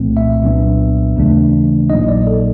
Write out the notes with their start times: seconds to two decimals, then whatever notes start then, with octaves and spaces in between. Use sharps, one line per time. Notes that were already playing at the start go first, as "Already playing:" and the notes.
Already playing: C2 A#2 F3 A3 C4
0.17 E5
0.41 C2 A#2 F#3 B3 D4
1.16 D#2 C#3 E3 A3 D4
1.90 A#1 A#2 F#3 A#3 D#4 D#5
2.08 D5
2.27 A4